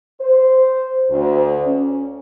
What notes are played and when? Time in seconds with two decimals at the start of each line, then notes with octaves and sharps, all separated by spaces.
0.21 C5
1.10 D2
1.66 C#4